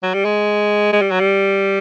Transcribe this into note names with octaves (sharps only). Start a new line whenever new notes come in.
F#3
G3
G#3
G#3
G3
F#3
G3